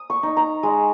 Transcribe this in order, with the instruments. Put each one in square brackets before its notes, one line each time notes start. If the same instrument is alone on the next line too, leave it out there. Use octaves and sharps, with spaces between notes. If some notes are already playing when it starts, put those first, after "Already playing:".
Already playing: [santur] D#6
C#6
D#4
A#5
G#3